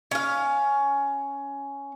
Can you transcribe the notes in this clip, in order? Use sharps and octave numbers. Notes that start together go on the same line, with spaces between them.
C#4 F5